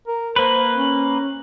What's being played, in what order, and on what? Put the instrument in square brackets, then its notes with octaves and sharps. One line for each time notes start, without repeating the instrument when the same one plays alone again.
[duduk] A#4
[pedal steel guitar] A#3 B4 [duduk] C5
[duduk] C#4